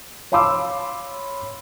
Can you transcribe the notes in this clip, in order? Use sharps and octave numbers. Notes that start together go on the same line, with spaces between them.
C#5 F5 B5 C6 D6 E6